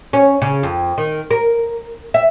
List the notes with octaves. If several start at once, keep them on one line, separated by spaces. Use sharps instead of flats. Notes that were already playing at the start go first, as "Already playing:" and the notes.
C#4
C#3
F2
D#3
A#4
E5